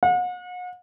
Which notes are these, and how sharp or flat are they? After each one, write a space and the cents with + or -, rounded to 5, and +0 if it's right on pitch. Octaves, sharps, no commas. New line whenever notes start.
F#5 -40